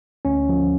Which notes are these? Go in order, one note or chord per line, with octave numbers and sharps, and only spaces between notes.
D2 C#4
F3